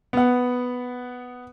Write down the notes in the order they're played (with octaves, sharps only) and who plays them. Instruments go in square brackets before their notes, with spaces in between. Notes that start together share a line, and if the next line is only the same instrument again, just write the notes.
[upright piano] B3 F#5